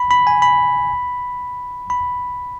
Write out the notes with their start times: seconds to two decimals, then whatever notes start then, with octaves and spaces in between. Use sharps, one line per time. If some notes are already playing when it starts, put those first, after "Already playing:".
Already playing: B5
0.11 B5
0.27 G#5
0.42 B5
1.90 B5